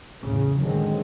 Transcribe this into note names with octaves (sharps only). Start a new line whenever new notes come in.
E2 A2 C#3
D3 D#3 F#3 G#3 C4